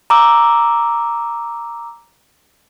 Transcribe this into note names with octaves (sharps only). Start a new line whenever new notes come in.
A#5 D6 E6